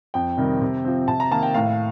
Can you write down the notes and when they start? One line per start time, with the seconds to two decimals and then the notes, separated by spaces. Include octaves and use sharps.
0.14 F2 G5
0.37 C3 D#3 G3
0.62 C3
0.85 F3 C4
1.08 C3 A5
1.20 A#5
1.31 D#3 A#3 A5
1.43 G5
1.54 A2 F5